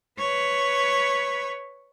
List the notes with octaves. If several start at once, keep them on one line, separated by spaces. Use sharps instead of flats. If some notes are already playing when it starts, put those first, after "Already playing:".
B4 C#5